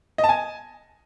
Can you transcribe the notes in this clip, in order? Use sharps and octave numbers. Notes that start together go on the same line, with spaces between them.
D#5
A5
G#5